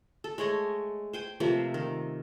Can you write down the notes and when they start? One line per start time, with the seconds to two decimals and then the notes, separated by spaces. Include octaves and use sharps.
0.24 A4
0.38 G#3 A3 C#5 D#5
1.13 C5 G5 G#5
1.40 C3 F3 A3 A#3
1.74 D#3